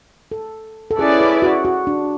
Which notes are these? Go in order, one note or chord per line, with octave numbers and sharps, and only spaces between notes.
A4
A4
C#4 E4 G#4 B4 D5
G#4
F#4
F#4
D4